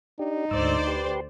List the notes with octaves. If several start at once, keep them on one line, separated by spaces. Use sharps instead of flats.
D4 D#4 G4
D2 G#2 C5 D5 E6
G4 B4 C6